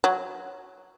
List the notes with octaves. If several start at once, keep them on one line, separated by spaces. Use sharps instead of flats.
F#3